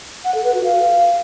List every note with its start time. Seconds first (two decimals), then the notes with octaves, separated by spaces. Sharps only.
0.25 F#5
0.35 A4
0.44 B4
0.54 F#4
0.64 F5